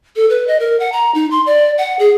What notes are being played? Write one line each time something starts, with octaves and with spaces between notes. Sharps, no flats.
A4
B4
D#5
A#4
F#5
A#5
D#4
C6
D5
F#5
G#4